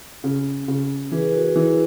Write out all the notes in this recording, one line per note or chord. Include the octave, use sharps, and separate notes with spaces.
C#3
C#3
E3 G#4 B4
F#4 A#4
E3 E4 G#4